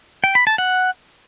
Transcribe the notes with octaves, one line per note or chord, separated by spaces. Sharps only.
G5
B5
A5
F#5